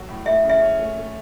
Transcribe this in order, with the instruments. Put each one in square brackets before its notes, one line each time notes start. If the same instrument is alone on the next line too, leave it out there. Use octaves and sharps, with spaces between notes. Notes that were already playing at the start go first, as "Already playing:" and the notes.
Already playing: [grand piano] F#3 F#4 A4
A2
[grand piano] A3 [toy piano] E5
[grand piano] C#3
[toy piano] E5
[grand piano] C#4
A3
A3